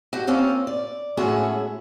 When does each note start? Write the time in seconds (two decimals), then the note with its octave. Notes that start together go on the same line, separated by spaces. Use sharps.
0.13 F#4 G4 G5
0.27 A#3 C4 C#4 F4
0.67 D5
1.17 A2 G#3 C#4 F#4 G#4 E5